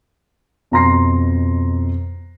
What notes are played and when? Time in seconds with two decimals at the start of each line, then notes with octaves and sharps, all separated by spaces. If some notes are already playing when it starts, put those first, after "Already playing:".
0.71 F2 B2 A#5 C6 A#6 C7